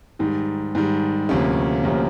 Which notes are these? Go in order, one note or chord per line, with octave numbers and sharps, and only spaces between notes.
G#2 D#3 G3
G#2 D#3 G3
D2 C3 F3 A#3 C#4
D2 C3 F3 A#3 C#4